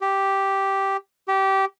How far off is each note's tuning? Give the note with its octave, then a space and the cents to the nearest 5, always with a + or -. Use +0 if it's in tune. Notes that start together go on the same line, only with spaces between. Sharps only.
G4 -5
G4 -20